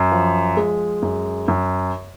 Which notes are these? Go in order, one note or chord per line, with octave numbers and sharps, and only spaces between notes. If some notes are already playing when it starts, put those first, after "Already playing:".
Already playing: F#2
F3
G#3
F#2
F#2